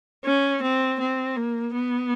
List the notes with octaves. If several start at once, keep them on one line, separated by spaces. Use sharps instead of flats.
C#4
C4
C4
A#3
B3